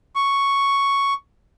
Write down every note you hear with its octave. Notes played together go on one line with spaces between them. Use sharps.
C#6